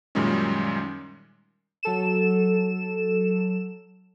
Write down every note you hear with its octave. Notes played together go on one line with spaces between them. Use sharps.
F#2 A#2 D#3 G3 G#3 C#4
F#3 A4 E7